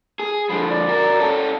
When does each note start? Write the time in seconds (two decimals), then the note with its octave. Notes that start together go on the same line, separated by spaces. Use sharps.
0.19 G#4
0.49 D3 F3 B5
0.70 D5
0.89 F#4 A#4
1.20 C#4 A4